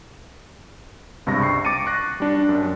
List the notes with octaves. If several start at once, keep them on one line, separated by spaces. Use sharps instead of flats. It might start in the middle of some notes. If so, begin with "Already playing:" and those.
C#2 G2 C3 C#6 A#6
C#6 C7
D6 A6 C#7 D#7
C#6 F#6 A#6
G3 D4
F#2